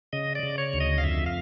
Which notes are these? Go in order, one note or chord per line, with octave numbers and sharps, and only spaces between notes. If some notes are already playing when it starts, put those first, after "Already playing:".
C#3 D#5
D5
C#3
C#5
D2
D#5
F5
F2 E5
F5